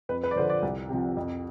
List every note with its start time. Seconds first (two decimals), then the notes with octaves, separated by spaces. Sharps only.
0.09 F2 B4
0.23 B4
0.31 D5
0.36 D3 F3 C5
0.50 D5
0.62 C2
0.89 C3 F3
1.17 F2